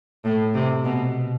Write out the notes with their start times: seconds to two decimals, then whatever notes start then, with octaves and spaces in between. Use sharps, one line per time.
0.25 A2
0.54 C3
0.84 B2